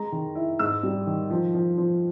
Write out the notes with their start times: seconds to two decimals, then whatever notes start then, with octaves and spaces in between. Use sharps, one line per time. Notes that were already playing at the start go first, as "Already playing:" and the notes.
Already playing: G#3 A#5
0.12 D#3
0.35 E4
0.59 G#2 E6
0.83 G3
1.07 D#3
1.30 F3
1.54 F3
1.78 F3